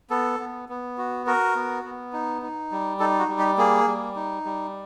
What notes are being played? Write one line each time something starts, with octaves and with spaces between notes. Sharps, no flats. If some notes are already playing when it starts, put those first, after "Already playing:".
B3 A4
B3
B3
F#4
F#4 A#4
B3
B3
D#4
D#4
G3
D#4 A4
F#4
G3
G4
A#3 G#4
G3
D#4
G3